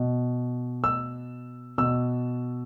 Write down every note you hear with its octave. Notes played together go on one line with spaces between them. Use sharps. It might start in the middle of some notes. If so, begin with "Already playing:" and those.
Already playing: B2
E6
B2 E6